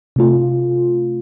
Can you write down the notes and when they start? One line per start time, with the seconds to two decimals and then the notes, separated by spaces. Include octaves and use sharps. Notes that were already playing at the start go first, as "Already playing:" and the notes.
0.16 C3 A3 F4